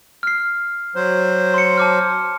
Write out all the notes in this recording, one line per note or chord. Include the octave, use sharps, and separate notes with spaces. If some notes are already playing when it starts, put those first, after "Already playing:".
F6 C7
F#3 C5
C6 C#7
A5 D6 F6